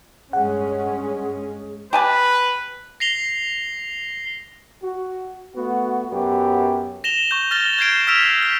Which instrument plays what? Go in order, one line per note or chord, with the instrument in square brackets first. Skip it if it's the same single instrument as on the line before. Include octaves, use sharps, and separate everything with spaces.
[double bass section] G2 G#3 C#4 [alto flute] G#4 [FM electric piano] F#5
[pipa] G4 G#5 A5 [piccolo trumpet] B4
[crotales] A#6 C7 F7 G7
[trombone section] F#4
A3 B3 F#4
F#2 B3 F#4 G4
[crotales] A#6 E7 F7 G7
C#6 G6
F6 A6 A#6 G7
G6 G#6 C7 D7 E7
E6 F6 B6 D7 E7 F7
B6